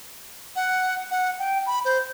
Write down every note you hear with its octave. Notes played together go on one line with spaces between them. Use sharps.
F#5
F#5
G5
B5
C5